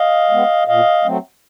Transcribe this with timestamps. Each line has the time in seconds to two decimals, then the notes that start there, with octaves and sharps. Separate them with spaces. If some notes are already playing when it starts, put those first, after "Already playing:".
Already playing: D#5 F5
0.30 G#3 B3
0.67 A#2 D#5 F5
1.05 F#3 A3 C4